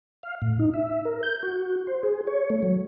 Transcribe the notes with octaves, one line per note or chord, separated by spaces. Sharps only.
F5
A2
D#4
E5
A#4
G6
F#4
C5
G#4
C#5
A3
F#3